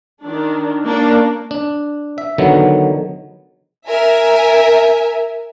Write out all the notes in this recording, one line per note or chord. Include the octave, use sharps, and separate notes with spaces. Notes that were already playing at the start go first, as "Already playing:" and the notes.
D#3 D4
A#3 C#4 D4
D4
E5
D3 D#3 F#3 B3
A#4 E5 G#5